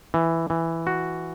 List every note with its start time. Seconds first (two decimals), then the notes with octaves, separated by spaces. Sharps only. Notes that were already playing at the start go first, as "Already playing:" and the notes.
0.14 E3
0.50 E3
0.87 F#4